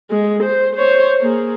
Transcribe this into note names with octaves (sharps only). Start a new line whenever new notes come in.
G#3
C5
C5 C#5
A#3 G#4